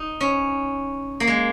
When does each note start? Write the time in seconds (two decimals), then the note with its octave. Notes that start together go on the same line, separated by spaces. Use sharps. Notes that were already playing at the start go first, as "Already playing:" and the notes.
Already playing: D#4
0.21 C#4
1.20 A#3
1.27 G#3